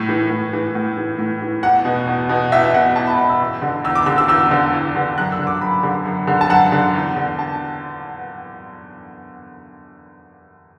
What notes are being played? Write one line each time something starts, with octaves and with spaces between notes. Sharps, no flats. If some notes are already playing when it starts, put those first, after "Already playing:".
Already playing: A2
E3
A2
E3
A2
E3
A2
E3
E2 F#5
B2
E2
B2
E2 E5
B2 F#5
E2 A5
B5
B2 B5
E6
E2
D3
E2 E6
D6
D3 E6
E6
E2 E6
D3
E2
D3
F#2 F#6
E6
D3
D6
F#2 B5
D3
F#2
D3
A5
F#2 F#5
D3
E2
D3
A5